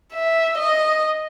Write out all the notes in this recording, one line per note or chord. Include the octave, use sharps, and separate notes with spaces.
E5
D#5